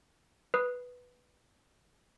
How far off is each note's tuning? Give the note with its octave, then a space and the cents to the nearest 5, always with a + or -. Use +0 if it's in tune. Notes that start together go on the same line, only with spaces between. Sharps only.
B4 +0 D#6 +0